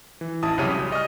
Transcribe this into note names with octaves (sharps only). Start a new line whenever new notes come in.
E3
A1 E4 A5 D#6
C2 F#2 C#3 G4 C#5 D#7
G3
D5 D#5 C#6 D#6 F6